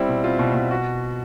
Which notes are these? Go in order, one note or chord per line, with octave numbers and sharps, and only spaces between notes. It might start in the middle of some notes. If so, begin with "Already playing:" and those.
Already playing: G3 C4 E4
B2
C4 F4
B2
B2
F#4